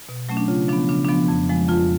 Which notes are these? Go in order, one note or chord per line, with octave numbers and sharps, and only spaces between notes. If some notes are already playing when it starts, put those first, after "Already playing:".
B2
F#3 A3 C#4
D4
C#3 F4
F3 B3 D4
C#3 D4
F3 B3 D4
F2
F3 G#3
F2 F4